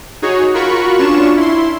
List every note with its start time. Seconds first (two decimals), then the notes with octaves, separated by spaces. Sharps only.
0.22 D#4 F#4 G#4 C#5
0.54 F4 F#4 A#4 B5 C#6
0.98 C#4 D4 F4 C#6 E7
1.37 E4 C6